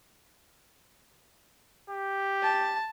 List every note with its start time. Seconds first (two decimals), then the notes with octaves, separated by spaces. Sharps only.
1.90 G4
2.43 A5